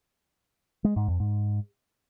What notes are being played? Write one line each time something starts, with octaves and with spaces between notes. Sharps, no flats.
G#3
G#2
F2
G#2